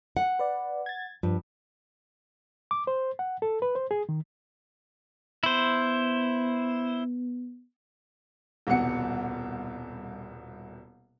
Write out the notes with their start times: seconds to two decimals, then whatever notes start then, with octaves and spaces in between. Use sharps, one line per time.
0.17 F#5
0.39 B4 D5
0.86 G#6 A6
1.23 G2 F3
2.71 D6
2.87 C5
3.19 F#5
3.42 A4
3.62 B4
3.75 C5
3.91 G#4
4.09 D#3
5.43 B3 E4 C5
8.67 D#1 C2 B2 F#5 C#7